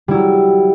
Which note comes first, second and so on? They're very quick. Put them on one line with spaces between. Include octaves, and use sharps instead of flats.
G3 E4 F#3